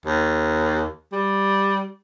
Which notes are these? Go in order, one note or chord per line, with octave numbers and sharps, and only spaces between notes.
D#2
G3